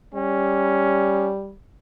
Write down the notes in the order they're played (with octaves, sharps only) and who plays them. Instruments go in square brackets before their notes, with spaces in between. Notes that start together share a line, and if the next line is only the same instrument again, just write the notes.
[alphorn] G3 [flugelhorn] C#4